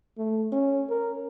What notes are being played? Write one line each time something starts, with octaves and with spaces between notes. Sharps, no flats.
A3
C#4
A#4